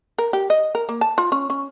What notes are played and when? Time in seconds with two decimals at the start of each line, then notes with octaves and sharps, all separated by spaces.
0.18 A#4
0.33 G4
0.50 D#5
0.75 A#4
0.89 A#3
1.01 A5
1.18 F4
1.32 C#4
1.50 C#4